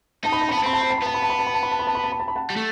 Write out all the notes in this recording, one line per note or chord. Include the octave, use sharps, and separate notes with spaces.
D#4 A5
B5
A5
B5
B3
A5
C4 B5
A5
B5
A5
B5
B3 A5
B5
A5
B5
A5
B5
A5
B5
A5
B5
A5
B5
A5
B5
A5
B5
F#5 A5
G3
A3